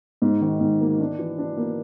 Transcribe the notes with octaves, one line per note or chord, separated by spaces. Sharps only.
G#2
D#3
G#2
A#3
D4
E3
D4
A#3